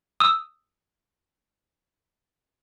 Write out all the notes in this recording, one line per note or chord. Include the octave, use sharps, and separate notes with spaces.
D#6 E6